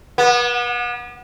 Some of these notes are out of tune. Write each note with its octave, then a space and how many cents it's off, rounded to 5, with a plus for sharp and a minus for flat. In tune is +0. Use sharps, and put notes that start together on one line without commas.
B3 -35